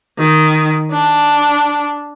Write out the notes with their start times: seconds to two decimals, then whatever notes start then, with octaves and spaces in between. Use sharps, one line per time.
0.19 D#3
0.91 D4